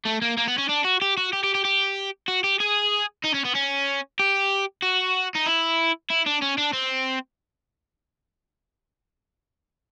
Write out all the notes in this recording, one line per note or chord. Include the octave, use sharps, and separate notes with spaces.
A3
A#3
A#3
B3
C#4
D4
F#4
G4
F#4
G4
G4
G4
G4
F#4
G4
G#4
D#4
C#4
B3
C#4
G4
F#4
D#4
E4
E4
D4
C#4
D4
C4